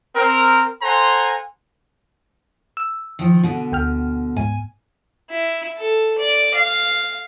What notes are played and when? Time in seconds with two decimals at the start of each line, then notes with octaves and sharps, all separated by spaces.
0.16 C4 A#4
0.82 A4 C5 F#5 G#5 A#5 C6
2.77 E6
3.19 D#3 F3
3.44 B2 D3
3.72 D2 G5 F6
4.36 G#2 G#5
5.30 E4
5.77 A4
6.18 D5
6.55 F5